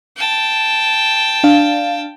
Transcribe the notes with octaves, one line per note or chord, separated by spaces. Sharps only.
G5 A5
D4 F5